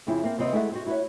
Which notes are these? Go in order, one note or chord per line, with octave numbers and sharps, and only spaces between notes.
F2 C#3 C4 E4
A#3 C4
D#2 C3 B3 C4 D#5 F#5
G#3 A3 E4 G#4 E5 F#5
C4 F#4
E4 F#4 B4 C#5 E5